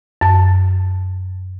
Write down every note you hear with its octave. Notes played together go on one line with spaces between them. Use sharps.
F#2 A5